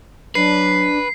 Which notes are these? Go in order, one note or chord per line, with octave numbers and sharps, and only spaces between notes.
F#3 D4 B4 C7